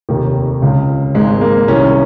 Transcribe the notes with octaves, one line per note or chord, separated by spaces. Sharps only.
F1 D#2 D#3
C#2 C#3
G#1 G#2 D#3 G#3
A#3
C2 C3 D#3 C#4